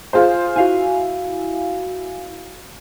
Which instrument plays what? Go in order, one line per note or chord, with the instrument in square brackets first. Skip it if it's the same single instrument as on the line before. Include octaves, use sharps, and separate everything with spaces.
[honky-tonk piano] F4 G#4 C5
[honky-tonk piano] E4 [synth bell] F#4 F5 G#5